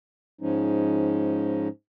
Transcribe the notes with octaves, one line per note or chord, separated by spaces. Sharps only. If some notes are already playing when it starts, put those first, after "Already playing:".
G#2 F3 G#3 C#4 D#4